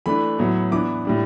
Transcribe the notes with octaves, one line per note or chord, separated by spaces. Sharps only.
E3 A3 D4 B5
A2 F#3 B3
E3 B3 D4 D6
A2 G3 D4